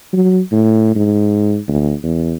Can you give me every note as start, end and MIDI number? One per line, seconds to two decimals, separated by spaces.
0.13 0.40 54
0.52 0.93 45
0.96 1.58 44
1.68 1.95 38
2.03 2.36 40